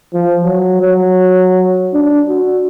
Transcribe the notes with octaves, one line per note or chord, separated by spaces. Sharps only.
F3
F#3
F#3
D4
F#4